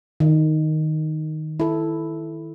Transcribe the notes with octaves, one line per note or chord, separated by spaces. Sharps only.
D#3
E4 A4